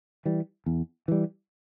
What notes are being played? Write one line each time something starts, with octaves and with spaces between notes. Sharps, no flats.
E3 G3
E2
E3 G3